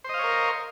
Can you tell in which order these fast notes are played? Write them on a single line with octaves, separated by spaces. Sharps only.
C5 D#5 F5 C#5 A#4